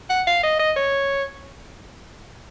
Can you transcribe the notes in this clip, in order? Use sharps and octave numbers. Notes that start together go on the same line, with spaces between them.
F#5
F5
D#5
D#5
C#5